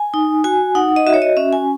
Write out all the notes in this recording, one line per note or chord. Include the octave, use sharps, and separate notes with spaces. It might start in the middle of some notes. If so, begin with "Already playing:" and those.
Already playing: G#5
D#4
F#4 G#5
D#4 F#5
D#5
F#4 E5
C#5
D#5
C#4 E5
G#5